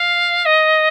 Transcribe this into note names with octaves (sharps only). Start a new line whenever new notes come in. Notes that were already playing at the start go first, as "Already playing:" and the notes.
Already playing: F5
D#5